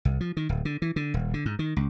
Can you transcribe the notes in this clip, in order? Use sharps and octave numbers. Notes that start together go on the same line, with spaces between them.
C2
F3
D#3
D1
D3
E3
D3
D#1
D3
G#2
D#3
C#2